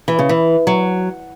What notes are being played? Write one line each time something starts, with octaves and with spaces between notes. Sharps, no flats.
E3
C#3
E3
F#3